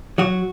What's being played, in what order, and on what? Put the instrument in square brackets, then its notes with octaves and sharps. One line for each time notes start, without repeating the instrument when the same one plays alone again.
[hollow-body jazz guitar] F#3 F#4